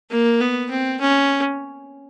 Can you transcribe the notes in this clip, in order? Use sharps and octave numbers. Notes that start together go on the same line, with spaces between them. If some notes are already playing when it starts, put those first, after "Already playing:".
A#3
B3
C4
C#4